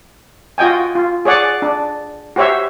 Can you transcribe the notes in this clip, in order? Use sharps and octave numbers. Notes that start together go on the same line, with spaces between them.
F4 F#4 D#5 G5 G#5
F4
G#4 C#5 D5 F#5
D4
F#4 G4 C5 C#5 E5